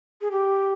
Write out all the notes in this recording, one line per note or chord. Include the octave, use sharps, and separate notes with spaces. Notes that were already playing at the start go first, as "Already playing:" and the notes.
G#4
G4